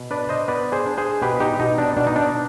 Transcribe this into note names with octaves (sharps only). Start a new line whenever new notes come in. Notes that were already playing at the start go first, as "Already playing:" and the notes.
Already playing: B2
D4 B4 D5
C5 D#5
B3 B4 D5
G#4 C5
D4
G#4 C5
B2 G4 B4
D#4 G4
B2 D#4
D4
B2 D4
D#4
D4